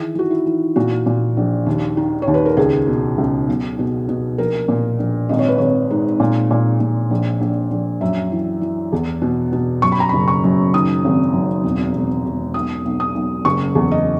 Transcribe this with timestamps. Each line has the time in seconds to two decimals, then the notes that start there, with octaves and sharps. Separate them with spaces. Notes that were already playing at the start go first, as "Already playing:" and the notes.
Already playing: D#3 E3 G#4
0.15 E3 F#4
0.31 E4
0.46 E3
0.76 A#2 F#4
1.06 A#2
1.37 A#1
1.66 D#2
1.97 D#3
2.22 C#5
2.27 D#2
2.34 B4
2.46 A#4
2.57 C#2 G#4
2.88 B2
3.18 C#2
3.48 B1
3.79 B2
4.09 B2
4.38 A#1 A#4
4.68 A#2
4.99 A#1
5.29 G#1 D#5
5.39 C#5
5.48 B4
5.58 G#1 C#5
5.91 G#2
6.20 A#2
6.51 A#2
6.80 A#2
7.11 A#1
7.41 A#1
7.71 A#1
8.01 F#2 E5
8.32 E3
8.61 E3
8.93 E2
9.22 B2
9.52 B2
9.82 F#2 C#6
9.92 B5
10.00 A#5
10.09 F#1 B5
10.28 C#6
10.44 F#2
10.74 D#3 D#6
11.04 G#1
11.33 F#2
11.64 E1
11.95 E1
12.25 E1
12.54 B1 D#6
12.85 B1
13.00 D#6
13.15 B1
13.45 F#1 C#6
13.75 E2
13.91 D#5